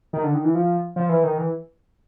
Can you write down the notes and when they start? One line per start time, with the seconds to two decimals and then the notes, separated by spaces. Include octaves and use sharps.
0.13 D#3
0.24 D3
0.34 D#3
0.45 E3
0.55 F3
0.96 F3
1.09 E3
1.24 D#3
1.38 E3